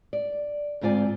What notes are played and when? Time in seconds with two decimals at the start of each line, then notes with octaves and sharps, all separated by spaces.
0.13 D5
0.81 D2 G#2 C4 F4 D5 G#5